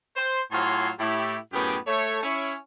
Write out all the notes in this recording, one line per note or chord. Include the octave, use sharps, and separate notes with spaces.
C5
A2 F#3 F4 G#5 C6
A2 E4 G4
F#2 A2 B3 G4 G#4 G5
A3 C#5
C#4 E4 C#5